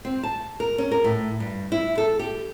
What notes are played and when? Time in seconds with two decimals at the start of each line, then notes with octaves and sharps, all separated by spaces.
0.05 C4
0.23 A5
0.60 A#4
0.78 C#4
0.92 A#4
1.04 A2
1.40 G2
1.72 E4
1.98 A4
2.19 G4